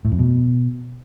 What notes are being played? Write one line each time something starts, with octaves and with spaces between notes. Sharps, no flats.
A2
F2
B2